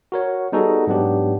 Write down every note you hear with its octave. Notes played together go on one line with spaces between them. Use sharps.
F#4 A#4 C#5
G3 B3 D#4 F#4 G#4 A4
G#2 F#3 B3 D4 G4